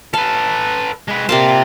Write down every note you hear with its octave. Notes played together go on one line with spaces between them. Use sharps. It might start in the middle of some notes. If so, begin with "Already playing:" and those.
A4 B4 F5
G#3 B4
C3 A#3 F4 A#4 A5